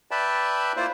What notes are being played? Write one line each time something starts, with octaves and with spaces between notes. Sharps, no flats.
B4 D5 E5 G5 A5 B5
A#3 E4 F4 C5 D5